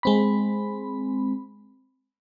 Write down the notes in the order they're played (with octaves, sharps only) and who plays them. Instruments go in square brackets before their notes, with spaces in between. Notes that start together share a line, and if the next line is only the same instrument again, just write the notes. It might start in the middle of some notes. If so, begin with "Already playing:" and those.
[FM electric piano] G#3 C4 B5